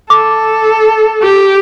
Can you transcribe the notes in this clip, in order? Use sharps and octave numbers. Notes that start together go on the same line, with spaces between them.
A4 D6
G4